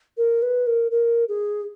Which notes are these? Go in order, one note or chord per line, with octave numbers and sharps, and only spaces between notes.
A#4
B4
A#4
A#4
G#4